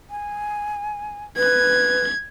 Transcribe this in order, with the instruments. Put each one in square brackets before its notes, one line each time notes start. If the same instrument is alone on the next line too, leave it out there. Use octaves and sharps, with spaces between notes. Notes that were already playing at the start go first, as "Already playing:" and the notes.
[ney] G#5
[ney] B4 [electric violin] G#6